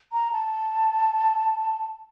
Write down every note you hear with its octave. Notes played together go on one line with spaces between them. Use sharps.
A#5
A5